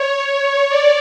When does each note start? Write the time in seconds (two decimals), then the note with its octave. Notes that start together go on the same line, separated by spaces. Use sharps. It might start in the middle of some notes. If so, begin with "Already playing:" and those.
Already playing: C#5
0.28 C#5
0.69 D5